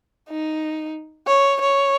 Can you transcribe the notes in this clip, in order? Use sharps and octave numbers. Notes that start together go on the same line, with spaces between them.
D#4
C#5
C#5